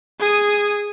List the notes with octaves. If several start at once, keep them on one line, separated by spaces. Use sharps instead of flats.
G#4 D#6